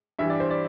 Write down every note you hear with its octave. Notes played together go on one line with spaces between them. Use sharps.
G2 E3 G3 E5
D5
C5
D5